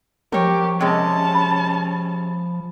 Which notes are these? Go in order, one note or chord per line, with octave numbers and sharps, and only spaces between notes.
F3 G4 A#4 C#5
C3 G#3 C#4 A5
B5